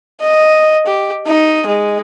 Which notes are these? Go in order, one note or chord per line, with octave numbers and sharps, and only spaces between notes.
D#5
G4
D#4
G#3